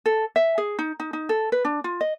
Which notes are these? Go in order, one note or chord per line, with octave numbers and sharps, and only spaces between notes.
A4
E5
G#4
D#4
D#4
D#4
A4
B4
D4
F4
D#5